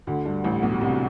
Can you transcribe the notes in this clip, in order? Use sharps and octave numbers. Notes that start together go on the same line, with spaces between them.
D2 D3
G2
A1 A2
B1 B2
C2 C3